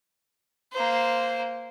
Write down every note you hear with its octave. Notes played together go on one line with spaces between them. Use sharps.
A#3 C5